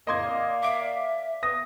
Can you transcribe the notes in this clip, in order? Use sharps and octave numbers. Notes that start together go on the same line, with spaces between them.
F2 A2 C#3 A#3 D#5 C6 G#6
D5 F5
E5 D6 D7
B3 D#6 A#6